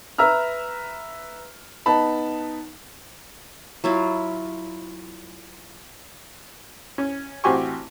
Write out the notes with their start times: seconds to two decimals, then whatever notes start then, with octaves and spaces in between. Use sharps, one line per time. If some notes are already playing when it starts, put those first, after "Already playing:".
0.18 B4 E5 A#5 E6 F6
1.86 B3 D#4 A5 B5
3.84 F#3 E4 F4
6.98 C#4
7.44 A1 C4 F#4 G4 G#5 C#6